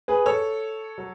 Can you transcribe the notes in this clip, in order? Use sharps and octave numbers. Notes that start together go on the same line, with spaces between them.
G#4 B4
A4 C#5
F#3